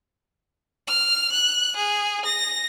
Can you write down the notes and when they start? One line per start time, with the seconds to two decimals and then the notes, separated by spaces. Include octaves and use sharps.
0.88 F6
1.32 F#6
1.76 G#4
2.25 A#6